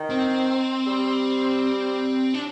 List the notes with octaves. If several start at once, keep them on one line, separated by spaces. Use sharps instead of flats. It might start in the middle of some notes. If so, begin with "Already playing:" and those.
Already playing: D#3
C4
G3
D4